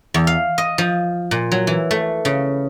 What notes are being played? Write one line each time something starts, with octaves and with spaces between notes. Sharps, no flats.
E2
F5
D#5
F3
A#2
F#3
E3
A3
C#3